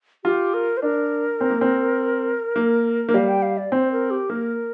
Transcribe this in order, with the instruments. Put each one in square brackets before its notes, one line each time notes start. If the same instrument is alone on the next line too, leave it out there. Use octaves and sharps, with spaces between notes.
[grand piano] F4 [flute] G4
[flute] A#4
C5
[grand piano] D4 [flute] A#4
[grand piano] C4
A#3
C4
A#3
A#3
[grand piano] G3 [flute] F5
[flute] G5
F5
D5
[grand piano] C4 [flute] C5
[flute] A#4
G4
[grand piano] A#3 [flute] A#4